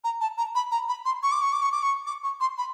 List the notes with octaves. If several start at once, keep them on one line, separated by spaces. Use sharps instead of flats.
A#5
A5
A#5
B5
A#5
B5
C6
C#6
D6
C#6
D6
C#6
D6
C#6
D6
C#6
C6
B5